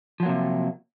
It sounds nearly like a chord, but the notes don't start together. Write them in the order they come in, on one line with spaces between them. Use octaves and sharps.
F3 F#3 A#3 C3